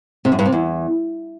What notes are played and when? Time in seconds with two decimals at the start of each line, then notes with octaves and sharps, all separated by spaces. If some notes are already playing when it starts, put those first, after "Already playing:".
0.25 C3
0.32 F#2
0.39 G2
0.46 C3
0.52 E2